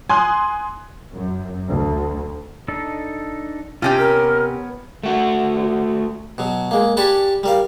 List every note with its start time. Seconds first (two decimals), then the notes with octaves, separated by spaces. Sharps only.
0.09 G#5 C6 D#6 F#6
1.14 F#2
1.67 D2
2.68 D4 D#4 A4
3.82 C3 C#4 F4 G4 A5 G6
3.98 B3 A#4 C#5 F6
5.03 A3 F#4
6.38 B2 F#3
6.71 G#3 A#3
6.97 D4 G4 G#5 A5 B5 C#6
7.43 G3 A#4 F5